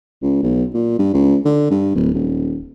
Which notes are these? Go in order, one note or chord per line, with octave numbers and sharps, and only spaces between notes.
C#2
B1
A#2
G2
C#2
D3
G2
D1
D#1